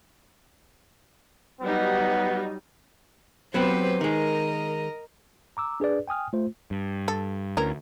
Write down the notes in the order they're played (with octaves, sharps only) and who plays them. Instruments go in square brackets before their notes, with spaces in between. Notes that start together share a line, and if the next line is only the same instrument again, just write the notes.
[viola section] F#3 G3 D#4 [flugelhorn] B3
[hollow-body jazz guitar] F#3 B3 C4 [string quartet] G4 B4 C5
[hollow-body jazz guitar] D#3 G#3 [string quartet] A#4 D#5 A#5
[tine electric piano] A#5 D6 E6
D4 G#4 B4 D5
G5 G#5 D#6 F6
A3 F4 C5
[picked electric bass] G2
[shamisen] A4
[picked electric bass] D2 [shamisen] E3 C#4 A#4